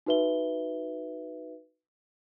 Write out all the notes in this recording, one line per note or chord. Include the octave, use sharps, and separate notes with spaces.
D#4 F#4 B4 E5 G7